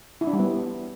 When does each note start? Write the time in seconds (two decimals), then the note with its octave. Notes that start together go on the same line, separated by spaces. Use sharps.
0.21 E4
0.27 D4
0.33 G3
0.39 B3